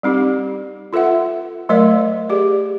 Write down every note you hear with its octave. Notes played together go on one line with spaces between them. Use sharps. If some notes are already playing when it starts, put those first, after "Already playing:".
G3 C4 D#4 G4
F4 A4 B4 E5 F#5
F#3 A3 A#4 D5 F5
G4 G#4 D5